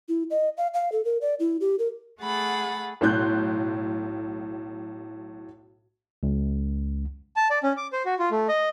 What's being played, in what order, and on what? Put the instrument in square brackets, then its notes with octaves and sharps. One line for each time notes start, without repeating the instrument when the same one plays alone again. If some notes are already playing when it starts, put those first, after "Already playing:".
[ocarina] E4
D#5
F5
F5
A4
A#4
D5
E4
G4
A#4
[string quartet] A3 G#4 F#5 B5 A6
[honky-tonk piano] B1 A2 C6 F#6 G6
[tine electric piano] C#2
[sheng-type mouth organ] A5
D5
C#4
D6
C5
F#4
F4
A3
D#5